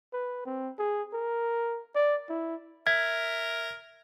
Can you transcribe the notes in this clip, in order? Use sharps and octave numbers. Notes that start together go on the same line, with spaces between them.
B4
C4
G#4
A#4
D5
E4
A#4 E5 G#6